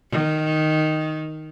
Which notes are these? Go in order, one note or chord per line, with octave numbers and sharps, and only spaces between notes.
D#3